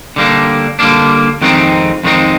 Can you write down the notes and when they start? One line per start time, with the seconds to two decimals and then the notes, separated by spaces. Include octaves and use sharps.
0.16 D3 G3 A#3 D4
0.79 D3 G3 A#3 D4
1.42 F2 D#3 G#3 C4 D#4
2.04 F2 D#3 G#3 C4 D#4